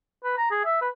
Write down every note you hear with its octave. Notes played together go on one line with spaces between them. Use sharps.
B4
A#5
G#4
E5
B4